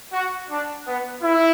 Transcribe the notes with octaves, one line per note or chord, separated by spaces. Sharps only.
F#4
D4
B3
E4